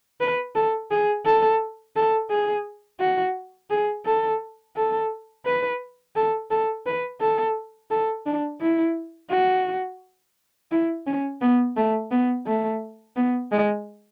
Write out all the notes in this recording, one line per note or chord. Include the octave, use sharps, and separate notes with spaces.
B4
A4
G#4
A4
A4
G#4
F#4
G#4
A4
A4
B4
A4
A4
B4
A4
A4
D4
E4
F#4
E4
C#4
B3
A3
B3
A3
B3
G#3